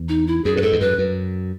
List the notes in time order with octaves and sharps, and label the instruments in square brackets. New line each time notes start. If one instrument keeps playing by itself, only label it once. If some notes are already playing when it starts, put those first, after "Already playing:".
Already playing: [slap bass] E2
[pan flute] D#4
E4
[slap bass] F#2 [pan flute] G#4
[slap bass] A2 [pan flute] B4
[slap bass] G#2 [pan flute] A4
[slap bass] E2
[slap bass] F#2 [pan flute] B4
[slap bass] F#2